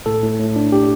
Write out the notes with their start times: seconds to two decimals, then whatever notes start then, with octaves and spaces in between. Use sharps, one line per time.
0.06 A2 A4
0.23 A2
0.39 A2
0.56 D4
0.72 D4 G4